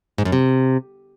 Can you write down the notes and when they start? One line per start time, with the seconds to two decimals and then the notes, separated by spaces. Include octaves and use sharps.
0.18 G#2
0.25 F#2
0.32 C3